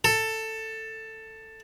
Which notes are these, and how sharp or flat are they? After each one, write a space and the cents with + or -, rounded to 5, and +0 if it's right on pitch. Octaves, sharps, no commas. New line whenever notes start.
A4 +10